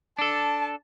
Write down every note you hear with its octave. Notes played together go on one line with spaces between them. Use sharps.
D4 A4 A5